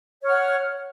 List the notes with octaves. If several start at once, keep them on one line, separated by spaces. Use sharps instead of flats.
C#5 F#5 F6